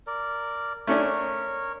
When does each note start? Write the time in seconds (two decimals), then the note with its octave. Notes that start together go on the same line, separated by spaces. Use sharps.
0.07 A#4 D5
0.87 A3 C#4 D4 A#4 C#5